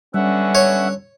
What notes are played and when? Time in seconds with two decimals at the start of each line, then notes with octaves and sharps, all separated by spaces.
0.14 D3 G3 B3 C#4 E5 F#5
0.55 C#5